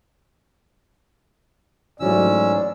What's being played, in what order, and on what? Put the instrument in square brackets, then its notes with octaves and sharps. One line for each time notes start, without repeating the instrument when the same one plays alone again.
[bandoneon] G#2 C#4 E6 [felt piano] E3 F#3 A3 [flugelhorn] D5